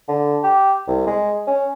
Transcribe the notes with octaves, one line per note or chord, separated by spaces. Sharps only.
D3
G4
C2
G#3
C#4